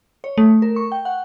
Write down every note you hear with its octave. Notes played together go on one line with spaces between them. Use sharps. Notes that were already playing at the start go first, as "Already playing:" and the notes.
C#5
A3
A#4
C#6
G5
F#5